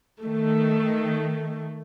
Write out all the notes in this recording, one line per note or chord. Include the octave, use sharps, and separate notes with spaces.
D#3 A3